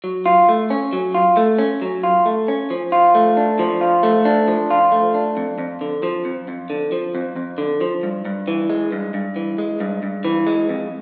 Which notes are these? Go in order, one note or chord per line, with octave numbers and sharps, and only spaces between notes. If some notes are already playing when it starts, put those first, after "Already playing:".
F#3
F4
A3
C#4
F#3
F4
A3
C#4
F#3
F4
A3
C#4
F3
F4
A3
D4
F3
F4
A3
D4
F3
F4
A3
D4
F2
F2
D3
F3
F2
F2
D3
F3
F2
F2
D3
F3
G2
G2
E3
G#3
G2
G2
E3
G#3
G2
G2
E3
G#3
F2